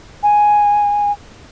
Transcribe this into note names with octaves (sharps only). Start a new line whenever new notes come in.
G#5